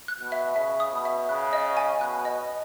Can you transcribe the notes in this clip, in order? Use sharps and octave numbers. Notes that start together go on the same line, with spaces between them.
F#6
B2
E5
C#3 E5
D#6
B2
E5
C#3 F#6
D#5
G#5
B2 F#6
D#5